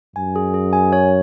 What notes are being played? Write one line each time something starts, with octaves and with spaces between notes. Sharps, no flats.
F#2 G#5
G#4
G#4
G#5
C#5